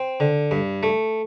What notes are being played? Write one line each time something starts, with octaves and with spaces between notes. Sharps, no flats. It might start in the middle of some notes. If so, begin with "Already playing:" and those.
Already playing: C4
D3
G2
A3